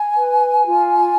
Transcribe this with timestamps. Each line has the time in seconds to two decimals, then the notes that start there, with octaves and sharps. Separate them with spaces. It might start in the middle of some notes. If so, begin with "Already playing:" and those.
Already playing: G#5
0.17 B4
0.65 F4